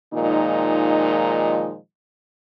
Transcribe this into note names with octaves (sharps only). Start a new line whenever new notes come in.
A#2 D#3 F3 G#3 D#4